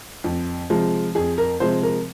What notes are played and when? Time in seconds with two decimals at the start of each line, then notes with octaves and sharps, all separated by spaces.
0.24 F2
0.70 C3 F3 G#3
1.15 F2 G#4
1.38 A#4
1.60 C3 F3 G#3 C5
1.83 A#4